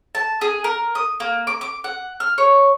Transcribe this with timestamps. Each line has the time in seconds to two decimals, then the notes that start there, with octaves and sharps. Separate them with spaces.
0.15 A5
0.41 G#4
0.64 A#4
0.95 D#6
1.20 A#3
1.47 D6
1.61 D6
1.84 F#5
2.20 F6
2.38 C#5